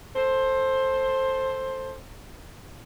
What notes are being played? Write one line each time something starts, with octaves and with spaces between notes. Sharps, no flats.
A4 C5